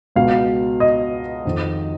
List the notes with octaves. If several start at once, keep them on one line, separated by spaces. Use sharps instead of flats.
C#2 B2 F5
D#5
F2 D#3